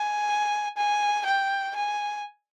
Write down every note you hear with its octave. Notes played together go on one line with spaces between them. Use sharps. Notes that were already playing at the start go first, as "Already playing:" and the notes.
Already playing: G#5
G#5
G5
G#5